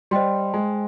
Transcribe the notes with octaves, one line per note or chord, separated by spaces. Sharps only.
G3 C5 D#5 G5 C6
G#3